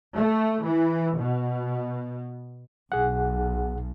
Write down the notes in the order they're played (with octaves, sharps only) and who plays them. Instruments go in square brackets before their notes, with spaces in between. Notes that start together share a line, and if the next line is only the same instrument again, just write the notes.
[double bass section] A3
E3
B2
[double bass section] B1 [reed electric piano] G#4 F#5